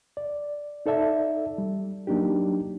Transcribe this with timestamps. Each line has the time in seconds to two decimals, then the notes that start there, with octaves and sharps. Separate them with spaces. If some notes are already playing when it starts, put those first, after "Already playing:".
0.17 D5
0.86 D#4 A4 D5 E5 A5
1.58 G3
2.07 F#3 A#3 D4 D#4 G4